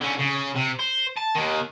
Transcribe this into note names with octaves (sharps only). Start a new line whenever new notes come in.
D3 C#4
C#3
C3
C5
A5
D#2 D#3